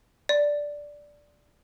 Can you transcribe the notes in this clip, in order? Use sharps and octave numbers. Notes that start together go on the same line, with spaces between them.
D5